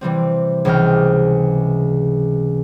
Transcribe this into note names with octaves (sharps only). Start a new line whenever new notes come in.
C3 E3 G3 C4
C#2 C3 E3 G#3 G5 F6